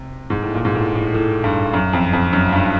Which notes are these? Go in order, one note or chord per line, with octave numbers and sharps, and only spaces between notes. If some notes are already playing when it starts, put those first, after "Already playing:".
Already playing: C3
G#2
A2
A#2
G#2
A2
A2
A2
G2
F#2
F2
F2
F#2
G2